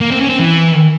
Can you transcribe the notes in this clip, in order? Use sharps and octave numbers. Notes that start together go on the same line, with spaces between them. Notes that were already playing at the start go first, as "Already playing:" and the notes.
A#3
C4
C#4
C4
E3